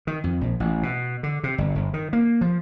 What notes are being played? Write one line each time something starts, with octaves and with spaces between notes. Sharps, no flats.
D#3
F2
A#1
A1
B2
D3
C3
G1
G1
D#3
A#3
F3